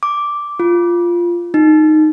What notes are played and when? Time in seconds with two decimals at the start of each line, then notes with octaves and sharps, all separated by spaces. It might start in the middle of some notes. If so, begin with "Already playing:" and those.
0.03 D6
0.60 F4
1.54 D#4